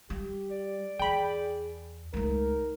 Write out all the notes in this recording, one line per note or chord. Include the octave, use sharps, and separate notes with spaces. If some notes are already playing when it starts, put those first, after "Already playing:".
G3 G4
D5
E2 G#4 G5 B5
C#2 A3 D#4 A#4